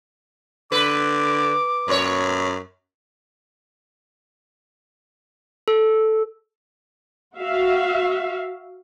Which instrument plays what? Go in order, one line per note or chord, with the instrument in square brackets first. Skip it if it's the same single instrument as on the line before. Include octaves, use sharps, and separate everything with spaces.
[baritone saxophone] D3 [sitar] B4 [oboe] D6
[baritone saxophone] F#2 [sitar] A#2 C#5
[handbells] A4
[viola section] F#4 E5 F5